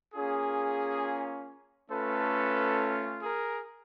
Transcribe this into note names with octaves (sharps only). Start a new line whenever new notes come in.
A#3 C#4 F4 G#4
A3 C#4 F4 A4 B4
G#4 A#4